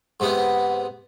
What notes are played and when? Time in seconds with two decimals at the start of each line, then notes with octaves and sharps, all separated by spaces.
0.20 G#2 C3 B3